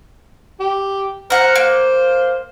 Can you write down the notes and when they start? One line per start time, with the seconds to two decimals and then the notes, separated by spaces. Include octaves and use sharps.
0.60 G4
1.30 A#4 C5 F#5
1.56 A#3